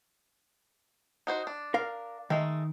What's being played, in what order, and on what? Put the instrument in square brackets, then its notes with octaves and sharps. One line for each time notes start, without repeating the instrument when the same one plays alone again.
[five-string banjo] D#4 F#4 C5
D4
[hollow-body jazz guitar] A#4 F5
[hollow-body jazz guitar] D#3 [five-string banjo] G#3 A3